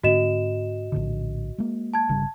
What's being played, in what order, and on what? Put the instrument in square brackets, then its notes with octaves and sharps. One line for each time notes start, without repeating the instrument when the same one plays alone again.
[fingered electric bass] G#2 D3 C4 [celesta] F#4 D#5 E7
[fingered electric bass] A#1 A2 D3
G#3 A#3
[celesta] A5 G#6
[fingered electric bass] G1 C#3 G3